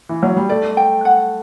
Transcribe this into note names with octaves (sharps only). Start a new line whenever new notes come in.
E3
F#3
G3
A3 D5
G5
F#5